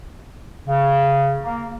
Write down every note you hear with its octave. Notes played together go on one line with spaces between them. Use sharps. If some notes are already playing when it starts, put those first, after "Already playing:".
C#3
A#3